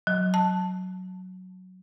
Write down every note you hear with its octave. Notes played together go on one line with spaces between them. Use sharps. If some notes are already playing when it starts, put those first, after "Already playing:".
F#3
A5